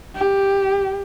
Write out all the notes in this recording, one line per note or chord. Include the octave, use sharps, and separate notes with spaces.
G4